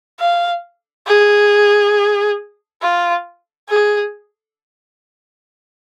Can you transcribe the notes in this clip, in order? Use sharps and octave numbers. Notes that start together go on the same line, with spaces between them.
F5
G#4
F4
G#4